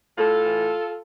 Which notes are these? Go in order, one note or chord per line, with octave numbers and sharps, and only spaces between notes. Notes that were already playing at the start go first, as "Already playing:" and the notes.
A2 F4 A4
E3